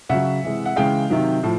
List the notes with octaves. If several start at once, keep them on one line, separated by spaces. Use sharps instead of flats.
C#3 F#3 E5 F#5
C3 E3 G#3
F#5
C#3 E3 G#3 F5 G5
C3 D#3 F#3
A2 F3